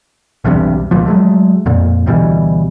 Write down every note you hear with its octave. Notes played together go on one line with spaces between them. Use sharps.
B1 E2 G2 C3
D#1 C#2 A#2 F3
F#3 G#3 A3
F2 A#2
D2 B2 E3 G3